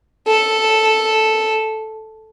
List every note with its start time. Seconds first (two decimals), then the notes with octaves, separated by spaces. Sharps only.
0.28 A4